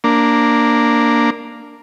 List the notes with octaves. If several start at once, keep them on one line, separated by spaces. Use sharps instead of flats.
A#3 D4